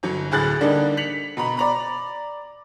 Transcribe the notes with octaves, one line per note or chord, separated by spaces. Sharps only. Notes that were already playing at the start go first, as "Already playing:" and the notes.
G1 F#3 C#7
D2 A2 G#4 B5 F#6 A6
D3 G3 A#3 D4 D#4
B6 C#7 F7 F#7
B2 A#5 B5
D5 A#5 B5